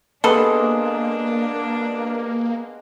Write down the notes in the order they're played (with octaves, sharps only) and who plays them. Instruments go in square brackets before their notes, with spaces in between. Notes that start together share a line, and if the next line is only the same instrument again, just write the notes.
[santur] G#3 B3 G4 [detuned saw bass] A#3 [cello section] D4 [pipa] A4 B4